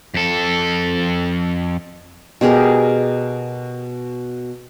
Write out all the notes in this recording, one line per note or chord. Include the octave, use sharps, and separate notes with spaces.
F2 A4
B2 G4 G#4 A#4